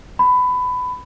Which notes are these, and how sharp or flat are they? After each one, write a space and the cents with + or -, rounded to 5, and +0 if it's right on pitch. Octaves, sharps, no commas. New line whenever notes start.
B5 +20